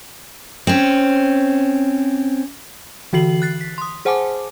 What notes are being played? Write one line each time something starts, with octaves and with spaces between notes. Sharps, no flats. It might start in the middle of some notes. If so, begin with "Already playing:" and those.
C4 C#4
D3 E3 F#4 C7 F#7
F#6 A6 C7
B6
C6 D#6
G#4 C5 F#5 G#5 A5 D6